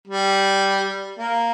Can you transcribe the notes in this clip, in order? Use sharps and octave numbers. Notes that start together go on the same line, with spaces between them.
G3
A#3